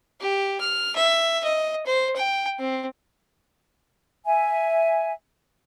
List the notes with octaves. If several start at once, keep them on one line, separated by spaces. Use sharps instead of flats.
G4
F6
E5
D#5
C5
G5
C4
E5 G#5